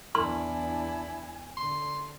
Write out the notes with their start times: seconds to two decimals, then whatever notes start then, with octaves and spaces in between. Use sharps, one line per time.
0.15 E2 D4 E4 G#5 C6
1.57 D3 C6